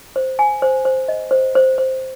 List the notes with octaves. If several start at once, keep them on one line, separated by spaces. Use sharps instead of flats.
C5
G#5
C5
C5
D#5
C5
C5
C5